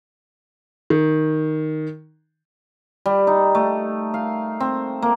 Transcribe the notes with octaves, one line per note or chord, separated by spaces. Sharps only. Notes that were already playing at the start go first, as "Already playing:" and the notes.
D#3
G3
D#4
A3
F5
C4
A#3